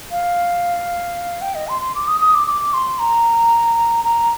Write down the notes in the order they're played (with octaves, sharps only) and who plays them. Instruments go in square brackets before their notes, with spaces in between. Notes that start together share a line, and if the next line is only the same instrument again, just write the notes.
[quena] F5
G5
D#5
C6
C6
D6
D#6
D#6
D6
D6
C6
A#5
A#5